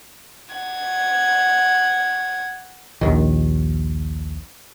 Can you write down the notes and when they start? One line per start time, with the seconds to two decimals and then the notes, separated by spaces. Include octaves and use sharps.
0.54 F#5 G#6
3.01 A#1 D#2 D#3